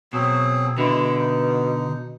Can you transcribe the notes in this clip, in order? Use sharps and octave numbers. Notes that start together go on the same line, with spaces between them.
B2 F#3 C4 G#4
B2 D3 G#3 E4
D#4